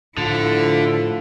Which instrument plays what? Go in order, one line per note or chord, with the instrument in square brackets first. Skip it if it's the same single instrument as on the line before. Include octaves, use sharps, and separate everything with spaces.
[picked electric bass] A2 [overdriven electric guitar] D3 [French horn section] F3 F4 [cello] E4 A4